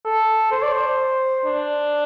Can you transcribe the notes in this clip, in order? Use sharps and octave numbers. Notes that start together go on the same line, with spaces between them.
A4
C5
D5
C5
D4